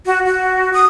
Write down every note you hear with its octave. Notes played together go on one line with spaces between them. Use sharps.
F#4
F#4
D#6